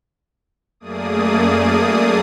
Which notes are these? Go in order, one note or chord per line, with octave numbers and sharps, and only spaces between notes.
F#2 A3 A#3 G#4 D5 D#6